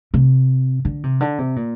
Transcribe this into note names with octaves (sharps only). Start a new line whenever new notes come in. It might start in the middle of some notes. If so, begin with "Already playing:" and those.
C3
D3
C3
D3
C3
A#2